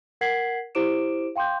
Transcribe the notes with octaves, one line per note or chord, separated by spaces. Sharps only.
A#4 F#5 G#6 B6 C7 F#7
E4 G4 C5 D6 D7 E7
F5 G5 C6 D6 G6